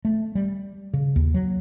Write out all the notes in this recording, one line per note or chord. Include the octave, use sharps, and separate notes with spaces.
A3
G3
C#3
D#2
F#3